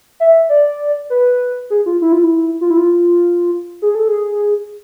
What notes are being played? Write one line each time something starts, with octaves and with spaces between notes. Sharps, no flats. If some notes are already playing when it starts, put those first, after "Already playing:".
E5
D5
B4
G#4
F4
E4
F4
E4
F4
E4
F4
G#4
A4
G#4